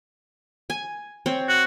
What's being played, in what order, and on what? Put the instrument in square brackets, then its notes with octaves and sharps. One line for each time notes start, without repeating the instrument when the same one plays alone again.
[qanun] G#5
C4 C#5
[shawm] F#4